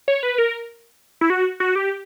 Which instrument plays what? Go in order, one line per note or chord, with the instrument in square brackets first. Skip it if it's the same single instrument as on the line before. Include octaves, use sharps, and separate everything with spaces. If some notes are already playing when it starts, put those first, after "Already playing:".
[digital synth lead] C#5
B4
A#4
E4
F#4
F#4
G4